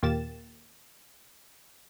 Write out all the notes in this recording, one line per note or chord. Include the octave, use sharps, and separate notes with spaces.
D#2 A#2 A#3 G4 A6 E7